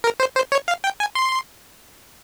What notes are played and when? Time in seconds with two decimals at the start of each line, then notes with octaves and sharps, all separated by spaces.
0.04 A#4
0.20 C5
0.36 C5
0.52 C#5
0.68 F5
0.84 G5
1.00 G#5
1.15 C6